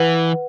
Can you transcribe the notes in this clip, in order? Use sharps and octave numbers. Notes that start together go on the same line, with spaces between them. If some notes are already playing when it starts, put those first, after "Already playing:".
Already playing: E3 B4 F#5